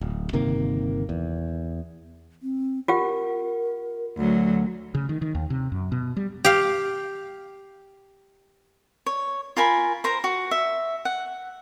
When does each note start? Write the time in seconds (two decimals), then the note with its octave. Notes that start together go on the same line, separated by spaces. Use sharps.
0.01 D1
0.33 G1 C3 D#3 A#3
1.09 E2
2.42 C4
2.88 F4 G4 A#4 F#5
4.17 D2 F#3
4.95 C#3
5.09 D#3
5.22 D#3
5.35 D#2
5.50 C3
5.72 F#2
5.92 B2
6.17 G3
6.44 G4 F5
9.06 C#5
9.57 F4 A#4 G#5 B5
10.04 A#4 C5 A#5
10.24 F#4
10.51 E5
11.05 F#5